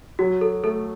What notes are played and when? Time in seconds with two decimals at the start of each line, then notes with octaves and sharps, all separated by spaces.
0.19 F#3 F#4
0.41 A4
0.64 A3 A4